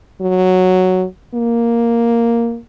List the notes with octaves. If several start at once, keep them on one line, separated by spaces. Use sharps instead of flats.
F#3
A#3